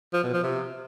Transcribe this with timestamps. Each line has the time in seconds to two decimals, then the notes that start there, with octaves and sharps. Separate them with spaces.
0.13 F3
0.23 B2
0.33 F3
0.43 C3